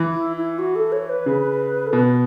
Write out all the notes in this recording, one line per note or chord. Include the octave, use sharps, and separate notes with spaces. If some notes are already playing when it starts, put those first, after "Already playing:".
Already playing: E3
E4
E4
F#4
A4
C#5
B4
C#3
A4
B2 B4